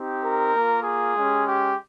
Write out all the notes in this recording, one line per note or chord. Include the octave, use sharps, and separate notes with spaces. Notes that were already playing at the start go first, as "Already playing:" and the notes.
Already playing: C4 D#4 G4
A#4
A#3 F4
G#4
G#3 C#4 G4
G4